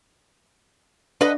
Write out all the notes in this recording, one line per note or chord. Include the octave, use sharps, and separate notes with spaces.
D4 B4 D#5 F#5